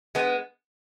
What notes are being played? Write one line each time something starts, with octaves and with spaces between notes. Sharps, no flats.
G#3 B3